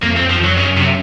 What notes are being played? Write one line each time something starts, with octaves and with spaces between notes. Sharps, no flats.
F2 A#3
C4
F2
F3
F2 F#3
F#2 C#3
C3